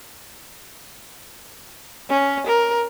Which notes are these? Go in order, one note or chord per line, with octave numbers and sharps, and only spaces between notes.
C#4
A#4